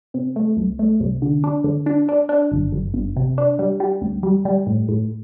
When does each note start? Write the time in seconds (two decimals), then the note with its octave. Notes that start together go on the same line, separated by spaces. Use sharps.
0.14 C3
0.36 A3
0.57 C2
0.79 A3
1.00 C2
1.22 D3
1.44 D4
1.64 D3
1.86 D4
2.09 D4
2.29 D4
2.52 G1
2.72 G1
2.94 G1
3.16 C3
3.38 D4
3.59 G3
3.80 G3
4.02 D2
4.23 G3
4.45 G3
4.67 A2
4.89 A2